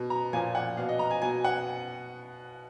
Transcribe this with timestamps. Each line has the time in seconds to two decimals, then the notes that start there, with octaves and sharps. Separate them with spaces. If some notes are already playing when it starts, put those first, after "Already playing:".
Already playing: B2
0.10 A#5
0.33 A#2 F3 G#5
0.55 F#5
0.77 B2 F5
0.89 D#5
0.99 A#5
1.11 G#5
1.22 B2 G#5
1.45 F#5